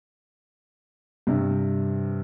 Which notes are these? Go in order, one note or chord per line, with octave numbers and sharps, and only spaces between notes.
G2 C3